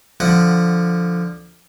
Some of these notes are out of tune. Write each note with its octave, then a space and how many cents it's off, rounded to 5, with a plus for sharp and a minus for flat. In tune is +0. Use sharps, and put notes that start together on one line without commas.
D3 +0 F3 +0 F#5 +0